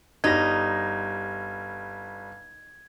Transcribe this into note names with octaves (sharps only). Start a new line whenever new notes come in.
G1 G3 D#4 G#6 A#6